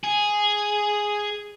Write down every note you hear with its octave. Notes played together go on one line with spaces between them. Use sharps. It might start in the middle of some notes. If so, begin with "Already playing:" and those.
G#4